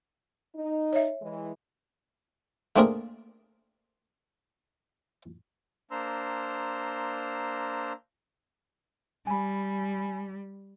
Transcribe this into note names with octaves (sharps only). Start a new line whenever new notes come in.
D#4
C#5 E5
E3 G#3
A3 A#3 C4 D4 G#4 A#4
A#3 D4 C5 A#5 C6 E6
G3 G#5 B5